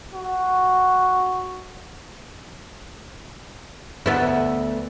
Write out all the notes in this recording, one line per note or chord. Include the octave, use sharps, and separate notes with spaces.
F#4
D2 B3 E4